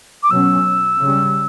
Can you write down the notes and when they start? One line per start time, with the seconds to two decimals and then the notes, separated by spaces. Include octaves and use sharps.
0.23 D6
0.30 B2 F#3 C#4 E6
1.01 C#3 G3 C#4